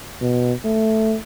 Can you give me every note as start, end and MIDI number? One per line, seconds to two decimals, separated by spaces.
0.21 0.53 47
0.65 1.16 57